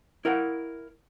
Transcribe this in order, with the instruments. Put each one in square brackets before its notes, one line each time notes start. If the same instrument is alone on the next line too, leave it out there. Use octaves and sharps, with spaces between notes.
[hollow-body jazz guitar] E4 A#4 F5 F#5